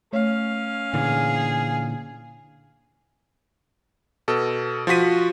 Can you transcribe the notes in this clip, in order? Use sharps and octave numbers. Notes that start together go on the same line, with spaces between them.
A3 C#4 C#5 F5
A#2 D3 E3 G#4
B2 A4
F3 F4 F#4 B6 D#7